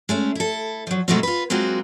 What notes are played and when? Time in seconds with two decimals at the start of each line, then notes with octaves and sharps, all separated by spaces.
0.09 G#3 A3 C#4
0.35 E4 A4
0.87 F3 F#3
1.08 B2 F#3 G#3 A3 B3 C4
1.23 F4 B4
1.50 F#3 G#3 A#3 C4 F4 F#4